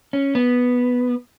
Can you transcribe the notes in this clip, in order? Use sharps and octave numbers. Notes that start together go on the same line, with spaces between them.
C#4
B3